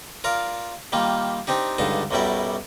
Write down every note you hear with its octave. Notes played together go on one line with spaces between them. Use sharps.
F4 A#4 D5 F5
D#3 G3 A#3 F4
C4 D4 D#4 G4
C#2 G2 D3 D4 D#4 A5
B1 F#2 F#3 G3 E4 D5